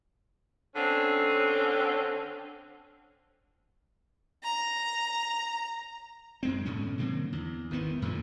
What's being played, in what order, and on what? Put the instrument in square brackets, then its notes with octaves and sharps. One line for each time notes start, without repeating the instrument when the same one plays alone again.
[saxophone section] D3 C4 C#4
[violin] A#5
[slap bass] F#2 G#3 C4
G#2 B2 D3 C#4
D3 F#3 A#3 C4
E2
G#1 D#3 E3 B3
F#2 A#2 D3 F3